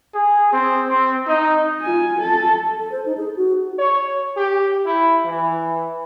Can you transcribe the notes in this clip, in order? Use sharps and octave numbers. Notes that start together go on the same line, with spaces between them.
G#4
C4
C4
D#4
F4 G#5
A4
A4
C5
D#4
G#4
F#4
C#5
G4
E4
E3